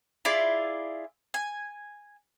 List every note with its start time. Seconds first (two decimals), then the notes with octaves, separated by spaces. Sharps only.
0.25 E4 F4 G#4 D5
1.34 G#5